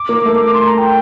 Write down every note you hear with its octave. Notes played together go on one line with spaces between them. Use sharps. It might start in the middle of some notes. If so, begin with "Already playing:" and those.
Already playing: D6
A#3
A3
D6
C6
A#5
G5